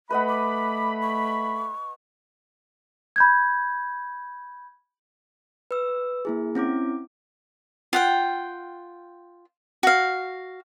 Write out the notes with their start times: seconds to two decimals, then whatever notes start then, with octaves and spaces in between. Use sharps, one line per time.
0.10 A3 B4 D#5 F#5 B5
0.29 D6
1.02 C#6
3.16 B5 G6 G#6
5.71 B4 E6
6.25 A#3 E4 G#4
6.55 C4 C#4 E4 D6
7.93 F4 F#5 G5
9.83 F#4 F5